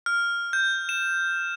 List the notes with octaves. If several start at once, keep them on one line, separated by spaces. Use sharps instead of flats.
F6
G6
E7